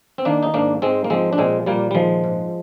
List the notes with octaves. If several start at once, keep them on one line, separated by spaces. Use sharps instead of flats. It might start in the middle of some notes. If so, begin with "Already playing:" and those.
C4
D#3 A#3 D4
D#4
G#2 A#3 D4
G#2 G#3 C4
A#3
F3 G#3 C4
D4
A#2 G#3 C4
A#2 G3 A#3
G3
D#3 F3 G#3
G#2